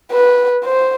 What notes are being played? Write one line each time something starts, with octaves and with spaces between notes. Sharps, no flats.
B4
C5